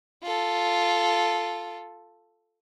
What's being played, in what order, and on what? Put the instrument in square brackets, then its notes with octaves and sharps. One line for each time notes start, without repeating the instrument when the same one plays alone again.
[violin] F4 A4